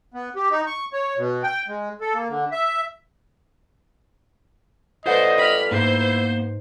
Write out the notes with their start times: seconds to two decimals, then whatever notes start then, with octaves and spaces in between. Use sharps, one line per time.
0.14 B3
0.36 G4
0.51 D#4
0.67 C#6
0.93 C#5
1.18 B2
1.43 G5
1.68 G#3
2.01 A4
2.14 A#3
2.29 D3
2.52 E5
5.06 F4 A4 B4 C5 D5 D#5 F#5 G6
5.38 G4 B5 F6
5.71 G#2 A#3 B3 E4 C5